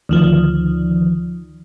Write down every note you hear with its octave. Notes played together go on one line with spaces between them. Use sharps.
D2 D#3 F3